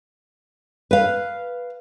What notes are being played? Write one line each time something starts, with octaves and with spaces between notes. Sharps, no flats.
B4 F5